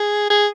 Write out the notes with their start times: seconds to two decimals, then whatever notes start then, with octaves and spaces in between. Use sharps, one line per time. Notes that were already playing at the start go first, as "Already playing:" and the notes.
Already playing: G#4
0.30 G#4